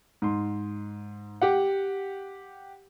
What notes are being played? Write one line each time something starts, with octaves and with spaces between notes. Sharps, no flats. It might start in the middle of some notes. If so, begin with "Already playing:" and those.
G#2 C6
G4 F#5